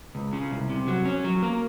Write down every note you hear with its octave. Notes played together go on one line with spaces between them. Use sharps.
C#2
C#3
C2
C3
F#3
C#4
F#3
A#3